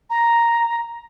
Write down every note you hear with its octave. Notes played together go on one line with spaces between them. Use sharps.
A#5